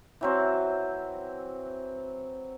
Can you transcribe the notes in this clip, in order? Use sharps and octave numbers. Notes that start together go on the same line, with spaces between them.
E3 F#3 C4